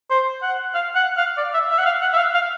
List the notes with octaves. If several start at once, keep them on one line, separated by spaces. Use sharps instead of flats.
C5
F#5
F5
F#5
F5
D5
E5
E5
F#5
F5
F#5
E5
F5
F5